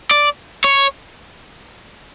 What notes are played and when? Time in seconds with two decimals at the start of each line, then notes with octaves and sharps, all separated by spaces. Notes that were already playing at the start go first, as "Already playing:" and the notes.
0.11 D5
0.64 C#5